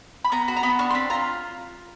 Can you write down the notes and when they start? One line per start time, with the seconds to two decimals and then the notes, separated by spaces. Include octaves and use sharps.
0.24 B5
0.32 B3 A#5
0.48 F#4
0.56 A#5
0.63 B3 B5
0.79 D4 C#6
0.90 C6
0.95 C4 B5
1.10 F4 A#5